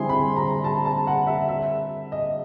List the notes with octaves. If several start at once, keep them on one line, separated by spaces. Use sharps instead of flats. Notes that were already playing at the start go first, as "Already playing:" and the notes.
Already playing: D3 G3 C4 E4 G#4 C6
B5
A#5
A5
A5
F#5
E5
E5
D#5